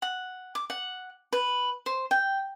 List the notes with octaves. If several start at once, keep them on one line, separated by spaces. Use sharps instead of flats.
F#5
D6
F#5
B4
C5
G5